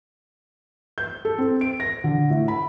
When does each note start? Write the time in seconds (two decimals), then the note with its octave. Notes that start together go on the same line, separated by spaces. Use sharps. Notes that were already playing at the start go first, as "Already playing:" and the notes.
0.98 G6
1.25 A4
1.38 C4
1.61 D7
1.80 A#6
2.04 D3
2.30 A2
2.48 B5